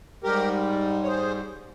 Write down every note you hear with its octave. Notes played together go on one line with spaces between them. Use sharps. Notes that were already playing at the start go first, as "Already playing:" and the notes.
G#2 G3 G4 A#4
C#5
G#4 C5